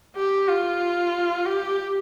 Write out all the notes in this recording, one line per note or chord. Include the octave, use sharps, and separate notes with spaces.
G4
F4
G4